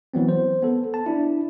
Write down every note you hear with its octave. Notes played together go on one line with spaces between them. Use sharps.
E3 F#3 B3 C4
C5
B3 A4
A5
D4 E4